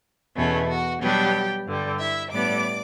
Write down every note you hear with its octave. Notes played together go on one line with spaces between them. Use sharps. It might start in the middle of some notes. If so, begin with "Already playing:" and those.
E2 B2 A3 C#4
F#4
B2 F#3 G3 B3 D4 G4
G2 D3 G3
E4 E5
A2 G3 B3 D4 D5 D6